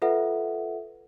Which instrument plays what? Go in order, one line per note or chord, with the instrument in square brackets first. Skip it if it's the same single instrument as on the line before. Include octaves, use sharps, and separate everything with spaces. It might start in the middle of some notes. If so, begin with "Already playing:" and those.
[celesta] F4 A4 B4 E5 F#5